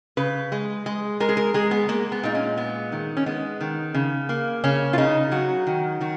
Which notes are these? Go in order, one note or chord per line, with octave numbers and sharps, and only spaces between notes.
C#3 B4
G#3
G#3
G#3 A#4
G#4
A#4
G#3 G#4
B3
G#3 A#3
B3
A#2 D#4
C#4
G#3 B3
D#3
C#4
G#3 B3
D#3
C#3
A#3
C#3 C#4
F4
C#3 D#4
F#3 F#4
D#3
D#3 F#4